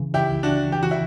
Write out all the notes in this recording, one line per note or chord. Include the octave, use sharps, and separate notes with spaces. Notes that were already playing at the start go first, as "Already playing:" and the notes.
Already playing: C#2 C#3 E3
E4 G4
C#2
D4 F#4
E3 G4
F#4
E4